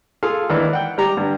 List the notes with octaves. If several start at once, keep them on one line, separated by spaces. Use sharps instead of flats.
F4 G#4 A4 F5
D#2 E3 D4 E4
F#5 G5
G3 G4 A#5
G2 D3